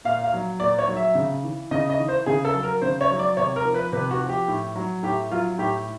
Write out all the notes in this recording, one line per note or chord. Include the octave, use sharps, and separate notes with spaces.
A#2 F5
F5
F#3
A#2 D5
C#5
F#3
E5
C#3
E3
C#3 D#5
D#5
E3
C5
C#3 G#4
A4
F#3
A#4
C#3 C5
C#5
F#3
D5
C3 C#5
A#4
F3
B4
C3 B4
F#4
F3
G4
A2
F#3
A2 G4
F#3 F4
A2 G4